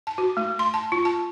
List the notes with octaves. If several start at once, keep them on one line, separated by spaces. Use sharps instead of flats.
A5
F#4
A3
C6
A5
F4
A5